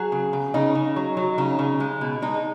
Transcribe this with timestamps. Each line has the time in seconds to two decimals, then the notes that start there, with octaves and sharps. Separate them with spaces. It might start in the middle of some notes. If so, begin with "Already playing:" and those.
Already playing: F#3 G#4
0.12 C#3
0.33 C#3
0.54 C#3 D#4
0.75 C#3
0.96 F#3
1.17 F#3
1.38 C#3 D#4
1.59 C#3
1.80 G#3
2.01 B2
2.22 G#3 D#4